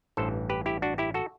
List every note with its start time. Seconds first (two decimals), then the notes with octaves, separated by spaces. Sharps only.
0.17 A1 G2 E3 A4 C5
0.50 G4 B4
0.66 E4 G4
0.82 D4 F#4
0.98 E4 G4
1.14 F#4 A4